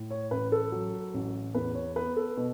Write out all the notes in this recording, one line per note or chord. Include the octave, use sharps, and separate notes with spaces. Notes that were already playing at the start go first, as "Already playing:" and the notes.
Already playing: A2
C#5
A1 B4
A4
F#3
A1
E2 B4
C#5
B3 B4
A4
B2